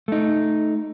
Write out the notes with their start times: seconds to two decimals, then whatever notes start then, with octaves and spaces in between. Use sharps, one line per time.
0.08 A3 D#4